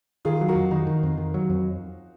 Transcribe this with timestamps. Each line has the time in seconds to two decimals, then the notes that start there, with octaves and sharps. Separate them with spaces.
0.25 D#3 F4 G#4
0.41 F#3
0.48 F#4 A#4
0.56 F2
0.71 D#3 D#4 F#4
0.87 D#3
1.03 F2
1.17 D#3
1.34 F#3
1.50 F2